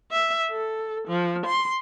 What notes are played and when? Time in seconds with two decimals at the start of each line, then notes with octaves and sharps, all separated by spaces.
0.12 E5
0.51 A4
1.08 F3
1.46 C6